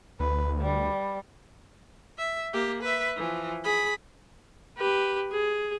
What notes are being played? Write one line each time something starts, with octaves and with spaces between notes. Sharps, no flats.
D2 B4
G3
E5
A#3 G4
B4 E5
E3 F3
G#4 B5
G4 B4
G#4